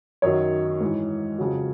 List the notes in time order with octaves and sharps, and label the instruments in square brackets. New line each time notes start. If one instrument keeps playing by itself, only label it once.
[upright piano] F#2 D#3 F#3 C#5
G#2 E3
F2 C#3 F#3